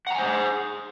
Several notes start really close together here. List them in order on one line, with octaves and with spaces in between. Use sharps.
F#5 A#5 G#5 C5 G#4